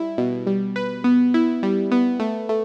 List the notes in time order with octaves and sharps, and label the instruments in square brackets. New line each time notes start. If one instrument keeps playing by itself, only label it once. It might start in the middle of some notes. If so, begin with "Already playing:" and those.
Already playing: [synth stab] G3 E4
B2
G3
B4
B3
E4
G3
B3
A3
A3